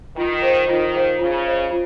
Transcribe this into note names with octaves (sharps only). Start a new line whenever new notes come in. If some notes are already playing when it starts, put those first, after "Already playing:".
D#3 F4
G#4 C5 F5
D#3 F4
G#4 C5 F5
C#3 F4
C5 D#5
F4